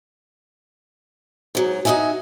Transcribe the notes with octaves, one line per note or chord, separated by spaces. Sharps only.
G#2 F#3
D#4 E4 F#4 E5 G#5